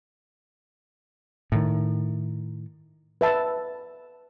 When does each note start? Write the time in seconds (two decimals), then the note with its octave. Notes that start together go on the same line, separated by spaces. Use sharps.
1.52 A2 D#3
3.21 B4 E5 A5